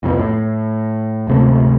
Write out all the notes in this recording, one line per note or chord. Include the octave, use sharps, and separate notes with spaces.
C2 F2 G#2 B2
A2
D1 G#1 C3 A3